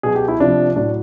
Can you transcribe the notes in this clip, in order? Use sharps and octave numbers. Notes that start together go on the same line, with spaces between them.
B2 F#3 G#4
G4
E4
C3 F3 D4
A2 F#3 D4